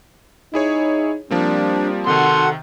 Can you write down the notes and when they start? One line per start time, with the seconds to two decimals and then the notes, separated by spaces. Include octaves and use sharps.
0.54 D#4 E4 G#4 C#5
1.31 F3 G3 A#3 C4 D4
2.07 C3 D#3 F#4 A4 F#5 C6